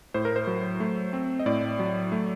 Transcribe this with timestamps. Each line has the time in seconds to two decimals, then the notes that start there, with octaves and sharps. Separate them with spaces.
0.14 A2 C5
0.25 A#4
0.36 C5
0.47 F#3
0.80 A3
1.13 C4
1.39 D#5
1.46 A2 D5
1.79 F#3
2.12 A3